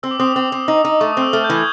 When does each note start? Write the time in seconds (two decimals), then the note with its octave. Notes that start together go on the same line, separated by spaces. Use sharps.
0.03 C4 E6
0.11 D6
0.20 C4 D#6
0.28 D6
0.36 C4
0.52 C4
0.68 D#4
0.85 D#4
1.00 A3 C#6
1.12 D#6
1.17 C4
1.22 E6
1.33 A3 F6
1.44 G6
1.50 E3
1.55 G#6